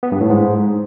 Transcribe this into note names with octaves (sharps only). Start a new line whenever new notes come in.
B3
G2
A2
G#2